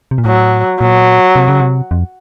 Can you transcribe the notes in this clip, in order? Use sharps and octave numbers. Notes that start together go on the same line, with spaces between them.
C3
A#2
A2 F#3
A#2 F#3
C3
C#3
C3
F2